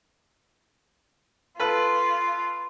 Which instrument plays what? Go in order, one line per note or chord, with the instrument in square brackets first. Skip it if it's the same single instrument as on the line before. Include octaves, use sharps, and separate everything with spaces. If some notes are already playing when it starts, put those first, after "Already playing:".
[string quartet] F4 [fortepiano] A4 B4 B5